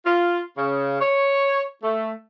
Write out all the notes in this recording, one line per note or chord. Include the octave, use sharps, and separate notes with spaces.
F4
C#3
C#5
A3